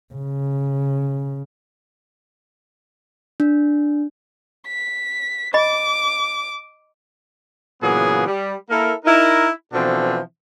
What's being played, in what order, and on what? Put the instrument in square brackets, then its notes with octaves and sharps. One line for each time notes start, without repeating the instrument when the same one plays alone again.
[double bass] C#3
[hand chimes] D4
[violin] B6
[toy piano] D#5 B5 [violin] D6
[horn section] A#2 C#3 E3 F#3 B3 G#4
G3
A#3 E4 A4 A#4
D#4 E4 A#4
B2 E3 F3 C4 D4 A4